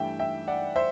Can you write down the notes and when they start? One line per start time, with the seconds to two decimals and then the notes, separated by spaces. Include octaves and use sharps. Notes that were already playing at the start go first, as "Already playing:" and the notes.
Already playing: G2 E3 A3 E5 G5
0.19 E5 G5
0.48 D5 F#5
0.76 C5 E5